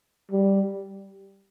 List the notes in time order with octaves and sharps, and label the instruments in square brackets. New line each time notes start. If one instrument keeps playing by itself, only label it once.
[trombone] G3